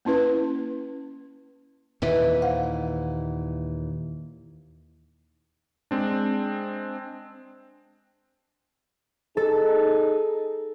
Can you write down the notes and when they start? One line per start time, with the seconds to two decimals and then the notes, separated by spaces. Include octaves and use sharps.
0.05 A#3 C#4 E4 B4
2.02 D#2 A#2 E3 B4 E5
2.42 C5 F5 F#5
5.91 G#3 C4 D4
9.37 D#4 G#4 A4